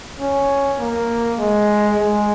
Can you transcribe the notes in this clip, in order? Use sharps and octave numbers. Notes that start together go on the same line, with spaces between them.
C#4
A#3
G#3
G#3